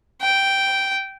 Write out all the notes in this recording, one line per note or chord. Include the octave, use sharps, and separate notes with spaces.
G5